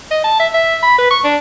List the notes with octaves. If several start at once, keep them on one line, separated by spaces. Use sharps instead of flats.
D#5
A5
E5
E5
B5
B4
C#6
D4